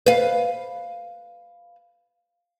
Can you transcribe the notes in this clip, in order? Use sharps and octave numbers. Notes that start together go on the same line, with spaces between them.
B4 F5